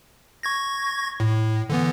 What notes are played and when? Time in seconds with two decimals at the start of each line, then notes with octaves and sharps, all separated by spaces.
0.43 C#6 G#6 A#6
1.20 A2
1.70 D3 E3 B3